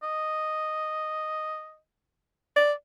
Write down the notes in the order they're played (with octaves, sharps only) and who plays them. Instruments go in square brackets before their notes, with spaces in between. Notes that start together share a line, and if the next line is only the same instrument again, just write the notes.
[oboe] D#5
[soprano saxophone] D5